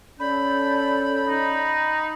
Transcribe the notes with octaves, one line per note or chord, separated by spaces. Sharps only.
C#4 A4 D5 B5 G6
D#4